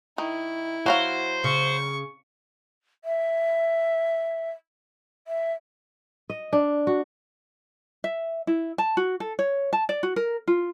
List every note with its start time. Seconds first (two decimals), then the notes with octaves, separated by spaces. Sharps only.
0.18 D#3 E4
0.86 F#3 F#4 C5 F5
1.44 C#3 C#6
3.04 E5
5.27 E5
6.30 D#5
6.53 D4
6.87 F#4
8.04 E5
8.47 E4
8.78 A5
8.97 F#4
9.20 A4
9.39 C#5
9.73 A5
9.89 D5
10.03 F#4
10.16 A#4
10.48 F4